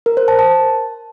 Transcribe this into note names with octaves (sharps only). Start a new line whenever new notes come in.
A#4
C5
A5
A5